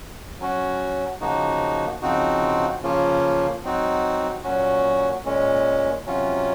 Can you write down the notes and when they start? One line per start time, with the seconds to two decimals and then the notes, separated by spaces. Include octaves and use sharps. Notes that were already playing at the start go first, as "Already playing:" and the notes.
0.40 F#3 C#4 F#4
1.20 C#3 F3 A#3 D#4 F#4
2.02 C#3 F3 C4 D#4 F#4
2.83 C#3 F3 A#3 C#4 F4
3.64 F#3 C4 D#4 F#4
4.44 A#2 F#3 C#4 F#4
5.25 A#2 G#3 C#4
6.06 C3 F#3 C#4 F4